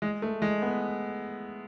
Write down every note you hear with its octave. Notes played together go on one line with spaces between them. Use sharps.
G#3
A3
G#3
B3